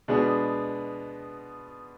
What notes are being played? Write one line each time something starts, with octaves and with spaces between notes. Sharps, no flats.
B2 G#3 B3 D4 G#4